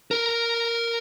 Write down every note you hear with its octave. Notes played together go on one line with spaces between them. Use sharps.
A#4